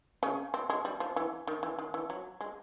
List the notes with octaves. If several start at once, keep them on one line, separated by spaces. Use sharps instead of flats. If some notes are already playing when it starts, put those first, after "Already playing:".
C#3 C#4
C4
G#3
G3
F3
E3
D#3
E3
D#3
E3
F#3
G#3